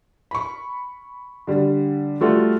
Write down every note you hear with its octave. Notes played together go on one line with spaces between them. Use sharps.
B5 C#6
D3 G3
G3 A3 F4 F#4